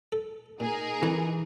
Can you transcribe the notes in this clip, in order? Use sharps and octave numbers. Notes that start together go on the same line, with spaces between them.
A4
A#2 D#4 G#4 A#4
F2 E3